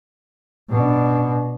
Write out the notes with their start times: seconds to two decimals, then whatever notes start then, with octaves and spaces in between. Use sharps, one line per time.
0.69 B2 D4